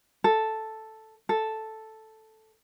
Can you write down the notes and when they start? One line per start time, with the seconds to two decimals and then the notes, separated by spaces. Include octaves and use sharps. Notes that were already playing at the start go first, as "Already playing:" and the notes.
0.24 A4
1.29 A4